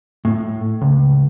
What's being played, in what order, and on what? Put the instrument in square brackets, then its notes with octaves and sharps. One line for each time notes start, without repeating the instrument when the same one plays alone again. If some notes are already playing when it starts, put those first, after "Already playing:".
[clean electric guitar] A2
C#2